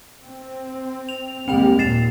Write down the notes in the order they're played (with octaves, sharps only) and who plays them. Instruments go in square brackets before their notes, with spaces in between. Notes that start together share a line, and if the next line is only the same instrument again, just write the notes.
[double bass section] C4
[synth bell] F7
[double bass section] D#2 G3 G#3 [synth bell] C4 G5 F7
[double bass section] D#2 A#2 [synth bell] A6 C7 E7